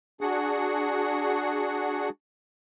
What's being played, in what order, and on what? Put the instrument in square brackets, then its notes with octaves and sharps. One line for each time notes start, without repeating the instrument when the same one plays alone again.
[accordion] D4 F#4 G#4 F#5